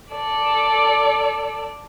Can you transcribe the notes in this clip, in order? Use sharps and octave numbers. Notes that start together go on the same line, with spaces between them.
A4 D5